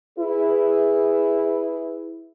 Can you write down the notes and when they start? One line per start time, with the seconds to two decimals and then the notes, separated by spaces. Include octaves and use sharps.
0.18 E4 G#4 B4